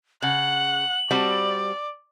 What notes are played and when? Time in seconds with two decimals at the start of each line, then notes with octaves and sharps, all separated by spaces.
0.22 C#3 F#5 F#7
1.11 G3 C4 F#4 D5